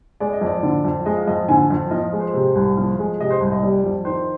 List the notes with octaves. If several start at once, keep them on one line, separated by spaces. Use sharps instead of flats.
G#3 D5
D#5
F2
D5
D3
F2
G#3 D#5
F5
F2 D#5
D3 G#5
F2
F3 D#5
G#3
C5
C3
C2
F3
G#3
C3 D#5
C5
C2
D#5
G3 D5
F2
D#3 C5